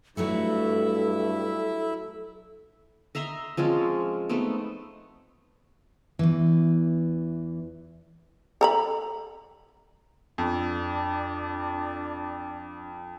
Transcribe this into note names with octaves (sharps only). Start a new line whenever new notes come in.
G2 F#3 A3 E4 F#4 A4 E5
D#5 E5 A#5 C6
F3 G#3 C4 C#4
A3 B3 C4 D#4
E2 E3
A4 A#5 B5
F2 D4